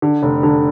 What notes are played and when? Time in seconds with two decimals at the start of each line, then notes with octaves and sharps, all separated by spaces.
0.02 D3
0.23 F1
0.43 D3